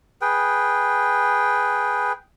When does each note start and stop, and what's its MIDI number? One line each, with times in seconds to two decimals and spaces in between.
0.21 2.12 68
0.21 2.12 71
0.21 2.12 79